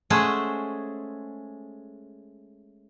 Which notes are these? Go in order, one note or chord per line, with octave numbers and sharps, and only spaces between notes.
G#3 A3 C#4 G#4 C5 F#5